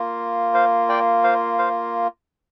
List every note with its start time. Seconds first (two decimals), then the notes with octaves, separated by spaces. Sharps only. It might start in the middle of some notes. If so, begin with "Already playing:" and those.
Already playing: A#3 F4
0.54 C5 F5
0.89 D5 G5
1.24 C5 F5
1.59 C5 F5